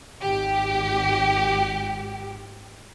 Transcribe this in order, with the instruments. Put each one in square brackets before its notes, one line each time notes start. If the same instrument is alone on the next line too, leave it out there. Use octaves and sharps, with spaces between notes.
[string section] G#1 G4